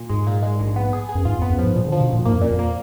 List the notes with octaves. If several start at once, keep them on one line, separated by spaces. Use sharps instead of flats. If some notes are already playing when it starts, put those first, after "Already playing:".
Already playing: A#2
G#2 G#3
A#2
G#3
A#1
B3
G#4
G#4
F#2
G#2 F4
F2 B3
F#2
G#2 F3
A#1 A#2
D3
F3
B2
A#1 A#2
G#2 A#3
F2
F#2 A#2
F2
A#3